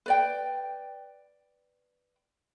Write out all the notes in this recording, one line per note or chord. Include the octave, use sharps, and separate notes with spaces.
B4 D5 G5